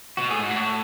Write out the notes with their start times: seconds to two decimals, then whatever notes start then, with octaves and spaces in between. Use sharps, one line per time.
0.17 B2 F#4
0.29 A2 G#4
0.39 G#2 F#4
0.50 A2
0.57 F#4